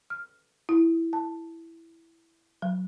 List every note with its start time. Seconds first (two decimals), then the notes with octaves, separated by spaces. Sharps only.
0.10 F6
0.69 E4
1.13 A5
2.62 F#3